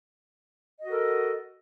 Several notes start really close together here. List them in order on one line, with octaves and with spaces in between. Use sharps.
D#5 F#4 A4 A#4